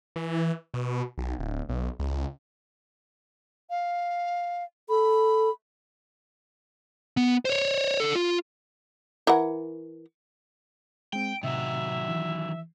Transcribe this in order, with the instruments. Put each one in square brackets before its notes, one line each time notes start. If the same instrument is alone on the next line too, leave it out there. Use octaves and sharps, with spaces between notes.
[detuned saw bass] E3
B2
B1
D1
B1
C#2
[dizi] F5
[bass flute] A4 [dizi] B5
[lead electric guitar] B3
C5 C#5
D3 A4
F4
[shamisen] E3 A#4 F#5
[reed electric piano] G#3 C4 [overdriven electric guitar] G5 [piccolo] D7
[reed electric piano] A2 C3 [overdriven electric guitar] D#3 F#3 [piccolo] E5
[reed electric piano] E3